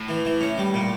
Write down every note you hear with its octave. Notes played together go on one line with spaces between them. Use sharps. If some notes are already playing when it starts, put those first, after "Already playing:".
Already playing: A2
E3
E3
C#4
G3
A#2